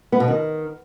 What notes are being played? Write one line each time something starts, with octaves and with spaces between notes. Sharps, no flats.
B3
B2
D#3